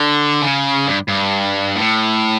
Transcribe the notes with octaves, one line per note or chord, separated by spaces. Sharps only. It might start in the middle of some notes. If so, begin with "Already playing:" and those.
Already playing: D3
C#3
G2
G2
A2